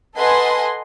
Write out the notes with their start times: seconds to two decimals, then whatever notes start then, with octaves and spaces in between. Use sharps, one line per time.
0.16 A4 B4 D#5 F#5 G#5 C6